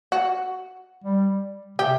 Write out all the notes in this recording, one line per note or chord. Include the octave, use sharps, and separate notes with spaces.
F#4
G3
C3 G4